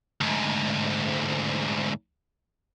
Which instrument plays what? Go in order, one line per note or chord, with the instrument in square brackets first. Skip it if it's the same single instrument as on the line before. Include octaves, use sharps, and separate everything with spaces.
[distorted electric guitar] D2 G#2